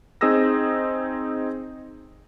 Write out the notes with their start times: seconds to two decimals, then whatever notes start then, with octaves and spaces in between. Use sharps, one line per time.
0.21 C4 D#4 G#4 D#6 E6 A#6